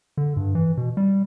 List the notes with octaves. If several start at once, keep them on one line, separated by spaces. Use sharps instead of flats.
D3
G2
E3
B2
G3